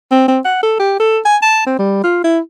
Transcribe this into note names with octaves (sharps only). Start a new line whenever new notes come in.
C4
C4
F#5
A4
G4
A4
G#5
A5
C4
G3
F4
E4